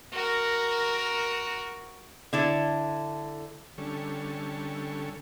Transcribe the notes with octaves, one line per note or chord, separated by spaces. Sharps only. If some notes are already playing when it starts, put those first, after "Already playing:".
F#4 A#4
D3 E4 A4
D3 G3 C#4 A4 C#6